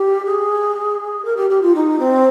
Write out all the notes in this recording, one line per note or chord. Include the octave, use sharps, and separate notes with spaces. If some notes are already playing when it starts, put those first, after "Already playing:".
Already playing: G4
G#4
A#4
G4
G4
F4
D#4
C4